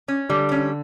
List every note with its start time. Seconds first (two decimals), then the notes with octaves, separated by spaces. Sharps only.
0.08 C#4
0.29 D3 G3
0.52 C#4